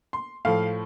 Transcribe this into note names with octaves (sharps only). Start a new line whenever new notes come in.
C6
A2 F3 F5